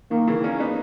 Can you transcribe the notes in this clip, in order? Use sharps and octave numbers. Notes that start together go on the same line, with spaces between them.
D#3 A#3
C#3 E3
A#3 C#4
B3 D#4